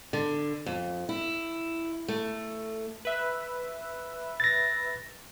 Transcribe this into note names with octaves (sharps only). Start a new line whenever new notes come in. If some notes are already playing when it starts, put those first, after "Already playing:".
D3
F2
E4
A3
B4 E5
A6 A#6